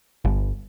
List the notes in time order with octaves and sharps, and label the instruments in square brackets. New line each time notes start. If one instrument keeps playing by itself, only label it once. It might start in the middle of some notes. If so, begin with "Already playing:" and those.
[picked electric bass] G1